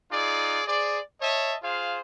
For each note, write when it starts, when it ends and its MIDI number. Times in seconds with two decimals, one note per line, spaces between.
0.11 0.62 63
0.11 0.62 65
0.11 0.62 68
0.11 0.62 74
0.68 1.01 68
0.68 1.01 72
0.68 1.01 74
1.21 1.56 73
1.21 1.56 75
1.21 1.56 76
1.21 1.56 81
1.63 1.99 65
1.63 1.99 68
1.63 1.99 72
1.63 1.99 77